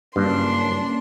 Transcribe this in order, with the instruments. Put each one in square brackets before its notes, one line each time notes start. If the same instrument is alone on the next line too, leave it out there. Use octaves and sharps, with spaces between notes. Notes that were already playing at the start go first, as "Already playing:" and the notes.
[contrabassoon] F#1 [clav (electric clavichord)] G2 [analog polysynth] A#3 C#4 [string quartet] D4 C6